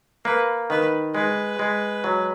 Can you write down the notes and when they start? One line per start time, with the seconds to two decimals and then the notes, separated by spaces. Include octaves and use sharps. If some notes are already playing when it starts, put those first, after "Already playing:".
0.25 A#3 B4
0.70 D#3 B4
1.15 G#3 B4
1.59 G#3
2.04 F#3